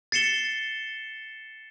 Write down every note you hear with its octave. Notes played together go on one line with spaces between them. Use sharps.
A6 C7 C#7 E7 G7